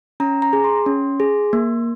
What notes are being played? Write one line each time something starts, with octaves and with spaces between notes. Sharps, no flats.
C#4 A#5
A#5
G#4
C6
C#4
G#4
A#3